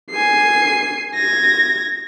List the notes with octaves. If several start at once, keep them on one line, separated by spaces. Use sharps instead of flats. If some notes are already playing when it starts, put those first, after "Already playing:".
G#5 C7
G#6 A#6